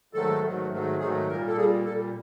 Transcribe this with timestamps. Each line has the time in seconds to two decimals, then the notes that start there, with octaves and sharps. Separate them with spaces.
0.13 G#2 D#3 F#3 A3 A4
0.42 G#2 D#3 F#3 A3
0.70 G#2 D#3 F#3 A3
0.99 G#2 D#3 F#3 A3 G#4
1.28 A#2 G3 A#3 A#4
1.47 A4
1.56 A#2 G3 A#3 G#4
1.85 A#2 G3 A#3 A4